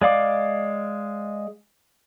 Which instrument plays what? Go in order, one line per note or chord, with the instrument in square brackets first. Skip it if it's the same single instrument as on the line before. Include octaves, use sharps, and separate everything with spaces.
[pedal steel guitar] G#3 D5 F5 D6